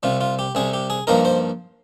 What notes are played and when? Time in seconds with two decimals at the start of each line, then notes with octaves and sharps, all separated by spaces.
0.03 C2 C3 G3 F4
0.21 F4
0.39 G4
0.55 C2 C3 G3 G#4
0.73 G4
0.90 G#4
1.07 G2 F3 A#3 D#4 A#4
1.25 C5